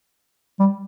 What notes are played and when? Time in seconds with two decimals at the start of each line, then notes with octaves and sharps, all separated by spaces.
0.60 G3